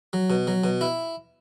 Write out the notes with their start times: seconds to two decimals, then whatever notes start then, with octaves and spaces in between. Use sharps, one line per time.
0.13 F#3
0.30 B2
0.47 F#3
0.64 B2
0.81 E4